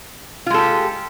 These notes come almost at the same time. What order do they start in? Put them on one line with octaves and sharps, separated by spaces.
F4 G#3 A4 G4